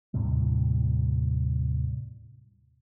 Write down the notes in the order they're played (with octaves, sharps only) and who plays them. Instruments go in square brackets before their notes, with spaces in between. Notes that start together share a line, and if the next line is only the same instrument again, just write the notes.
[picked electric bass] D#2 A2 C3 G3